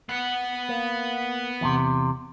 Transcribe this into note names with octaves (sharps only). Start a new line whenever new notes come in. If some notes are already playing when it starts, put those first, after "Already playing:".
B3 F#5
A#3
E2 A2 C3